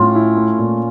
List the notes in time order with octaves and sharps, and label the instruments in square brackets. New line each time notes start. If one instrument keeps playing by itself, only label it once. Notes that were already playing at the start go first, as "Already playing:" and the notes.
Already playing: [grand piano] A2 [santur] C#4 F4
[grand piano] E4
A3
A#2